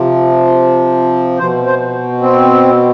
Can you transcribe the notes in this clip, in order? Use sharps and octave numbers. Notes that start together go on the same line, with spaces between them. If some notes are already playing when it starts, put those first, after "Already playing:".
Already playing: C3 F3
B2 C5
C5
C4